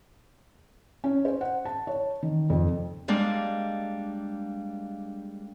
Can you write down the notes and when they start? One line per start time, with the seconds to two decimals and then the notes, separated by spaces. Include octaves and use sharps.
1.04 C#4
1.25 C5
1.41 F#5
1.65 A5
1.87 C#5
2.23 D#3
2.50 F2
3.08 G3 G#3 A#3 D4